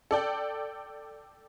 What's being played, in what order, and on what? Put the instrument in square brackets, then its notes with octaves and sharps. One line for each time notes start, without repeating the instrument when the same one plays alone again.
[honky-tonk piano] A4 D5 G5